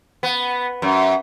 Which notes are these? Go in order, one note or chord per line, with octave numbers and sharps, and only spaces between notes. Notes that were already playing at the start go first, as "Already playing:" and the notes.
B3
F#2